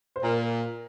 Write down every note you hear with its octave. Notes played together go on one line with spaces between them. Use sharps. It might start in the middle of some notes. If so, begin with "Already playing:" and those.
C5
A#2 A#4